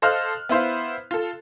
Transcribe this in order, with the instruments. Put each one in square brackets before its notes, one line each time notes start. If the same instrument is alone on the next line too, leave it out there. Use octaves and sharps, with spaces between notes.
[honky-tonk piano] A4 C5 D#5 F5 F6 F#6
B3 E4 C5 F5
F4 A4